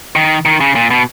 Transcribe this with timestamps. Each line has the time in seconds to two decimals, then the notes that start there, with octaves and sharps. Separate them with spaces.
0.16 D#3
0.45 D#3
0.61 C#3
0.75 A#2
0.91 B2